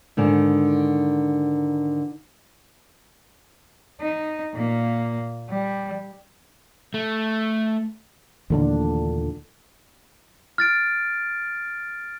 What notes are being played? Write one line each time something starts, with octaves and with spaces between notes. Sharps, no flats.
G#2 D3 D#3
D#4
A#2 A#3
G3
A3
D#2 A#2 D3 E3 A3 D4
F6 A6 D7